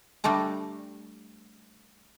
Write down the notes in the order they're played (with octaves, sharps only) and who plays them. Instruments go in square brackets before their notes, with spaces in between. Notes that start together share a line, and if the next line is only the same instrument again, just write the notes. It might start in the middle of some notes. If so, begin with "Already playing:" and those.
[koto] G3 A3 D4 A4 A#5